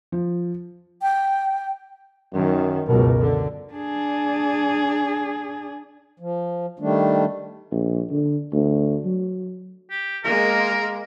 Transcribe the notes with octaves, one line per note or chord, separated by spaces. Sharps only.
F3
G5
F#2 D#3
C#2 F#2 B2 A#4
D3
D4 G#4
F3
D#3 G3 A3 D4
A#1
D3
D2
F#3
G4
G#3 A#3 A#4